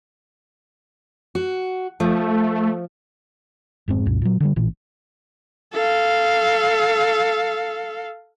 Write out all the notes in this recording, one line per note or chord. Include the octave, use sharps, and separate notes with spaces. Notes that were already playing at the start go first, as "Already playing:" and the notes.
F#4
F3 A3
F1 G#2 C4
C2 F#2 A#2
A#2 F#3
D3 E3 G3
A1 A#2 E3
A4 F5